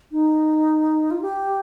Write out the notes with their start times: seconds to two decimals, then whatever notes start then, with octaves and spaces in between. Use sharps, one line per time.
0.12 D#4
1.11 F4
1.22 G4